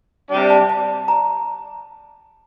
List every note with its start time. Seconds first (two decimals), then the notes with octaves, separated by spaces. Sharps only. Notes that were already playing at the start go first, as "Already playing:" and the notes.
0.30 C3 G3 D4
0.50 A5
0.69 A5
1.08 A#5